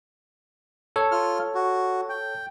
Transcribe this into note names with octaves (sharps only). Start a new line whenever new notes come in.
A4 C#5
F4 F6
F#4
G5